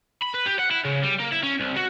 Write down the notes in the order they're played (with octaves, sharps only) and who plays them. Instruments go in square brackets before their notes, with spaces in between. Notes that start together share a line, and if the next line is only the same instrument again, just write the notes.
[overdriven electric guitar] B5
B4
G4
F#5
E4
C#3
G3
A#3
E4
C#4
C2
F#4